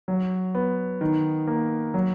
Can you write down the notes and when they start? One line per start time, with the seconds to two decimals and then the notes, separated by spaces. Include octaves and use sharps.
0.08 F#3
0.55 B3
1.01 D#3
1.48 A#3
1.94 F#3